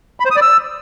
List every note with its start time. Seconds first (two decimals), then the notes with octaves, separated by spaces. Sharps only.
0.20 B5
0.25 C5
0.31 D#6
0.36 D5
0.42 E6